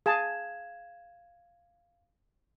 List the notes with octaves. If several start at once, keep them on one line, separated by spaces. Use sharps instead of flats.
G#4 F5 A5 G#6 E7